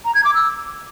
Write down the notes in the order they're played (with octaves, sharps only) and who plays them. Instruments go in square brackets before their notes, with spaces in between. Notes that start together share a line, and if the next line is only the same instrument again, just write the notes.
[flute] A#5
G#6
D6
E6